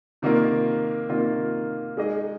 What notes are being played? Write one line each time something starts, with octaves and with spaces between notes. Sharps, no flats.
C3 D#3 A#3 F4 A#4
C3 D#3 A#3 F4 A#4
G#3 D#4 G#4 D#5